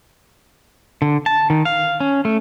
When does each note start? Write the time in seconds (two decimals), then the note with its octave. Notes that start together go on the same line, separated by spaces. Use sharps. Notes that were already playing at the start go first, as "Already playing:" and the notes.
1.02 D3
1.26 A5
1.50 D#3
1.65 F5
2.00 C#4
2.25 A3